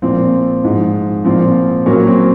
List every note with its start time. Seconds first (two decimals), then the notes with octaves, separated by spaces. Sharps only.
0.02 A#2 F3 C4
0.63 G#2 F3
1.25 A#2 F3 C4
1.86 A#2 F#3 A#3 C#4
2.07 C4